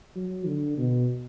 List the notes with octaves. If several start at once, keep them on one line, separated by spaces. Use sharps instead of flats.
F#3
D3
B2